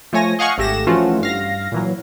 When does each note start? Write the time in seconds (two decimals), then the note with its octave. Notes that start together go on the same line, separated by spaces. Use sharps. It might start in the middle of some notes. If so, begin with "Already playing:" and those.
0.13 F3 A3 C#5 G#5 A#6
0.39 D#5 F5 F#5 G#5 C#6
0.58 G#1 A3 G4 A#6 E7
0.87 E3 F3 A3 C#4 F4 F#4
1.21 G2 F5 A#6
1.72 A#2 E3 F#3